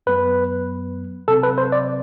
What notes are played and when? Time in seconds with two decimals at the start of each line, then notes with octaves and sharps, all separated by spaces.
0.06 F#2 F#3 B3 B4
1.28 C3 F#3 C4 A4
1.43 B4
1.58 C5
1.72 D5